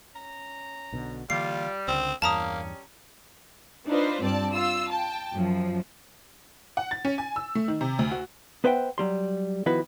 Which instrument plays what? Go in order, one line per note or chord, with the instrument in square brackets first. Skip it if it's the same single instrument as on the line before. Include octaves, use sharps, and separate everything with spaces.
[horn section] C#4 A#5
[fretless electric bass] B1 B2 D3
[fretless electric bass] D3 E3 A#3 [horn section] G3 [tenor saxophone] F4 [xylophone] C7
[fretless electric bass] C#2 D3 [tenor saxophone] C4
[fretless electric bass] E2 G2 [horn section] G3 C#4 [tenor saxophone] A#3 [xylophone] A5 A#5 D#6
[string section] D4 D#4 F4 B4 C5
G2 C4 D5 A5
F4 E6
G5 A5
F#2 F3
[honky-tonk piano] F#5
A6
C#4
G#5
E6
A3
D#3
C3
D2
F#4
[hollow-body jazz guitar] B3 B4 C5 E5 F#5 G5
F#3 G3 C6
D#3 F3 B3 E4 F#4 B4